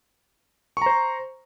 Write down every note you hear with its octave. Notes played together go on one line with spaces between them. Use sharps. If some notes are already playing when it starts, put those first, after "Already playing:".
C5 A#5 C#6